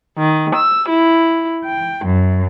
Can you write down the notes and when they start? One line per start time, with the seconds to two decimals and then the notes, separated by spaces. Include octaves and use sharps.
0.18 D#3
0.55 E6
0.88 E4
1.64 G5
2.04 F#2